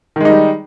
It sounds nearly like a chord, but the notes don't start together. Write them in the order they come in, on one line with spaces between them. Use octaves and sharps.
D#3 G#3 D#4 G3